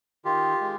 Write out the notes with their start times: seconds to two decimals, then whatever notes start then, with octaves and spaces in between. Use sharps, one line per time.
0.25 D#3 F4 G4
0.61 G#3